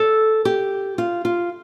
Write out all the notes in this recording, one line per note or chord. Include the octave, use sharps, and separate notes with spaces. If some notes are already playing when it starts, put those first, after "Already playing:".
Already playing: A4
G4
F4
F4